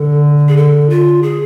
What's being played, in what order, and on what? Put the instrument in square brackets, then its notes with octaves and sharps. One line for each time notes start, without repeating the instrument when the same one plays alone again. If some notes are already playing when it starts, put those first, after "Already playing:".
Already playing: [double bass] D3 [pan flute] A4
[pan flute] G#4
A4
F4
G#4